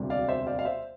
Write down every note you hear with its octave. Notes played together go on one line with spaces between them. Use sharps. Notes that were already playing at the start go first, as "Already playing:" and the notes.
Already playing: E1 D2 C3 G3
D5 F5
C5 E5
D5 F5
F5
C5 E5